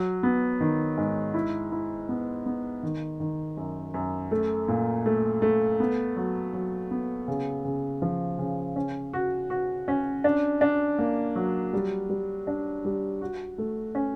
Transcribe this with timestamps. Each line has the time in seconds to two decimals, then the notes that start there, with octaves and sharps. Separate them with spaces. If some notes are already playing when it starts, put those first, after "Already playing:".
Already playing: F#3
0.23 B3
0.60 D#3
0.98 G#2
1.34 E4
1.72 E4
2.09 B3
2.46 B3
2.83 D#3
3.20 D#3
3.57 F#2
3.94 F#2
4.31 A3
4.68 A#2
5.06 A3
5.42 A3
5.80 B3
6.16 F#3
6.54 F#3
6.91 B3
7.28 C#3
7.65 C#3
8.02 F3
8.39 C#3
8.76 C#4
9.13 F#4
9.50 F#4
9.88 C#4
10.24 D4
10.61 D4
10.99 A#3
11.35 F#3
11.73 G3
12.09 G3
12.47 D4
12.85 G3
13.21 F#4
13.58 A3
13.95 C#4